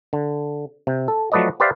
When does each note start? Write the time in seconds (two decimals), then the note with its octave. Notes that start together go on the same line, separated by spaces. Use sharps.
0.13 D3
0.87 C3
1.08 A4
1.32 F3 F#3 A3 B4 D5 D#5
1.60 G4 B4 C5 D5 E5 F5